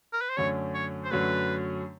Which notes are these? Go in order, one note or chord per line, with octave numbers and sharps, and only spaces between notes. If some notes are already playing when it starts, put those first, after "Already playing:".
A#4
B4
C5
F#2 D3 F#3 A3 C#4 C#5
C#5
C5
F#2 D3 F#3 A3 C#4 B4